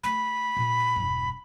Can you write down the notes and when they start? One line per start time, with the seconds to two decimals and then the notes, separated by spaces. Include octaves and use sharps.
0.04 A3 B5
0.57 A#2
0.96 E1 G2